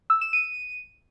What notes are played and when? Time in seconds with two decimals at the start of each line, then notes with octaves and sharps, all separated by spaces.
0.10 E6
0.21 E7
0.33 D#7